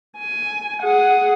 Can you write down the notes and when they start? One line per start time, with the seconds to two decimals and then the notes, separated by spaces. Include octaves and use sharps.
0.18 G#5
0.82 G#4 F#5